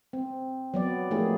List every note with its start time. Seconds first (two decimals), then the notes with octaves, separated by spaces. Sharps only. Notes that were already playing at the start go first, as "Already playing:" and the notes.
0.13 C4
0.74 F#3 B3 D5
1.11 F3 A3 A#3 D#4 G4 G#4